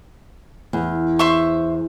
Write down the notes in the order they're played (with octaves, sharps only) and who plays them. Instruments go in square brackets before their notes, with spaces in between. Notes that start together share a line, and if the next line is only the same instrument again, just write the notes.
[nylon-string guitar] E2
[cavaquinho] C5 E5 C#6